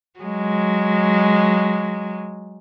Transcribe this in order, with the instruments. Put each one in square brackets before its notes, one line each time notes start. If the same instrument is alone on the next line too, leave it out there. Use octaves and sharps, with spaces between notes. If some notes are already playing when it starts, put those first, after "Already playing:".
[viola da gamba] F#3 G#3